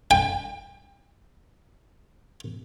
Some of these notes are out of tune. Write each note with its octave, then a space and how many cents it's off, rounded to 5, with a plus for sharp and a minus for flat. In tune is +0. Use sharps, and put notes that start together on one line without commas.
G5 +30